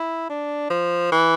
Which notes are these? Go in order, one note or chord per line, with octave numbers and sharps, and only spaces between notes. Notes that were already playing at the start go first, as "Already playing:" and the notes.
Already playing: E4
D4
F3
E3